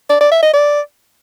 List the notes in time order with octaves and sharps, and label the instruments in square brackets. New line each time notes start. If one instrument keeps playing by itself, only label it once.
[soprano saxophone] D5
D5
E5
D#5
D5